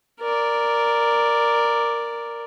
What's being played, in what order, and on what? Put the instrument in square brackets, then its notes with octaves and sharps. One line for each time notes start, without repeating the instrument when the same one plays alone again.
[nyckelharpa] A#4 D5